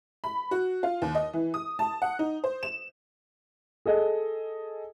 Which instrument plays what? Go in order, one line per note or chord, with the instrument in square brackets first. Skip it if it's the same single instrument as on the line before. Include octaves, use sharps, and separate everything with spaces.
[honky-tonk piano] B5
F#4
F4
D#2
D#5
E3
D#6
A5
F#5
D#4
C5
E7
[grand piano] G#4 A4 D#5